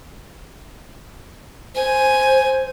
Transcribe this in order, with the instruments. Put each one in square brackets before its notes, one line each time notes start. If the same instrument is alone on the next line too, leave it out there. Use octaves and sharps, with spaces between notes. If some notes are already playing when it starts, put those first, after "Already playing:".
[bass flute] C5 [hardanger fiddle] G#5